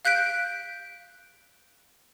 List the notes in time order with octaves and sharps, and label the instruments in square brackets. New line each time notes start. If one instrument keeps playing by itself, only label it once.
[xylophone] F5 F#6 G6 B6 D7